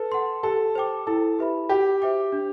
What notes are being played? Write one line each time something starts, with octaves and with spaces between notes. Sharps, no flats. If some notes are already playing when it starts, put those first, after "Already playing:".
Already playing: A4 B4
F#5 C6
G4 A4
C5 G5 D6
E4 A4
G4 B4 E5 B5
F#4 G4
C5 E5 G5 D6
D4